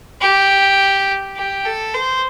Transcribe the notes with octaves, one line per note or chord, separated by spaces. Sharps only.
G4
G4
A4
C5